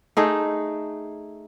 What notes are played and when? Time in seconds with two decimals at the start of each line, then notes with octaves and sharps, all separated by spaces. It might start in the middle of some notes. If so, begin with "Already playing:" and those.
0.17 A3 D#4 G#4